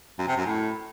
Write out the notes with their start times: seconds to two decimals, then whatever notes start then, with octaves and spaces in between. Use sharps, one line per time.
0.19 F#2
0.28 C3
0.37 F#2
0.46 A2